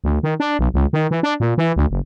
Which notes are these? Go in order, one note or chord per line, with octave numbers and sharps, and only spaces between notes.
D2
D#3
D4
B1
C#2
D#3
E3
D4
A#2
E3
D2
F#1